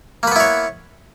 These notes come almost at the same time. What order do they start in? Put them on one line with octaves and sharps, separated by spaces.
A#3 B4 B3 E4 C#5